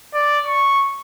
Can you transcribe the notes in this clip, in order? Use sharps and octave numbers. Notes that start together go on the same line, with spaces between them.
D5
C#6